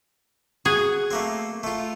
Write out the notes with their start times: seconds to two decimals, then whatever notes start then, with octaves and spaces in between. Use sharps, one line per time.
0.65 F#4 G#4
1.11 A3 A#3 C4
1.63 A3 F4